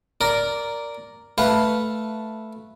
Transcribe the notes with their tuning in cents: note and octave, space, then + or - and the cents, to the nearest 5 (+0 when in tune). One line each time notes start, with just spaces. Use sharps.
A#4 +0 D5 -10
A3 +0 B4 -5 F5 +0